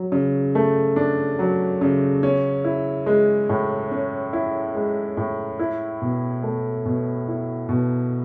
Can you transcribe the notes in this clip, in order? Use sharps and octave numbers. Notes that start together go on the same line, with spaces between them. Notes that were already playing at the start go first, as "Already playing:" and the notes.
Already playing: F#3
C#3
A3
D4
F#3
C#3
C#4
E4
G#3
A2
C#4
E4
G#3
A2
E4
B2
A3
B2
E4
B2